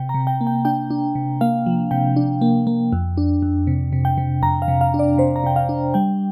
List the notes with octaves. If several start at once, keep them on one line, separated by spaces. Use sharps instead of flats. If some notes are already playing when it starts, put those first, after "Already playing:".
Already playing: C3 G5
A#5
C3
G5
A#3
G5
D4 G5
D4
C3
A#3 F5
F3
C3 G5
D4
A#3
A#3
F2
D4
F2
C3
C3
G5
C3
F2 A#5
F5
C3
F5
D4
D5
C3 C5
A#5
C3 G5
F5
D4
G3 G5